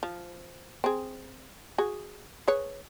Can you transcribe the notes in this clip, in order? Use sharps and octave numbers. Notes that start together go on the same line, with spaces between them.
F3
C4 G#4
F#4 G#4
G#4 B4 C#5